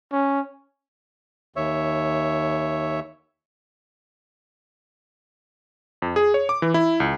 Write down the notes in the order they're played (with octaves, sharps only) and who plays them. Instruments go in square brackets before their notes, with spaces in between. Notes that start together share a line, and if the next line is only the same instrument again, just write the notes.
[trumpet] C#4
[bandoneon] D#2 C#5 E5
[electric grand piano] F2
G#4
C#5
D6
E3
E4
C#2